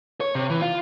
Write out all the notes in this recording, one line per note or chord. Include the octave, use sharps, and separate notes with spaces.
C#5
C3
E3
F4